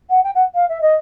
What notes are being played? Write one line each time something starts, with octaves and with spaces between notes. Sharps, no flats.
F#5
G5
F#5
F5
E5
D#5